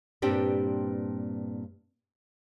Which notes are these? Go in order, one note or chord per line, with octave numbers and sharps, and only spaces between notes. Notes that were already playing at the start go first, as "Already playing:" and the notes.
G2 A#2 C4 D4 G4 B4